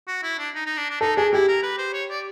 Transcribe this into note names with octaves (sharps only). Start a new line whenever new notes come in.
F#4
E4
D4
D#4
D#4
D4
D4
D#4 A4
D4 G#4
E4 G4
A#4
B4
C5
C#5
D5